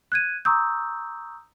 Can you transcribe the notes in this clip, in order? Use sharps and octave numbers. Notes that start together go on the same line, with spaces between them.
F#6 G#6 D#7
A#5 C#6 D#6 E6 G6